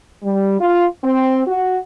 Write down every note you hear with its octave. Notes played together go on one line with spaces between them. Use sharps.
G3
F4
C4
F#4